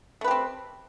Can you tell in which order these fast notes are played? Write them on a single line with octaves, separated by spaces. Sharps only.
A3 B4 G4 C4